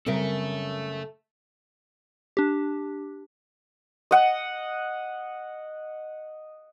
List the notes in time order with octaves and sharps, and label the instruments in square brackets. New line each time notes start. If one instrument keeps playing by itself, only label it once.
[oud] F#2 C#3 A#4 [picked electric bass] G3 G#3 C4 [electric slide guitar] A4 E5
[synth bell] D4 G4
[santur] D#5 F#5